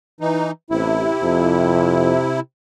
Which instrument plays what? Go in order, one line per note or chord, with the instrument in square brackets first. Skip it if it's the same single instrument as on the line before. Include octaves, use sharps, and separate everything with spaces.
[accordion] E3 D#4
[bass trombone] A1 [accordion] C3 E4
[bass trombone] F2